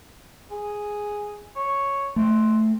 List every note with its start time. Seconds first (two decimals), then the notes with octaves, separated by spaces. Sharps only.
0.51 G#4
1.56 C#5
2.16 A3 C4